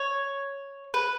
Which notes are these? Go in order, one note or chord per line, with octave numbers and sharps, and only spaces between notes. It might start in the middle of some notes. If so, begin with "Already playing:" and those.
Already playing: C#5
B4